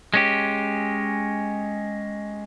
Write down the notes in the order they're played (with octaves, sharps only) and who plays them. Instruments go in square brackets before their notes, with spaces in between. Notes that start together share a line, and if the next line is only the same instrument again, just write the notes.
[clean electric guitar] G#3 C#4 G4